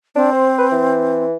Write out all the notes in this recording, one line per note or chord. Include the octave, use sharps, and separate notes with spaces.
C4 D4
C5
B4
E3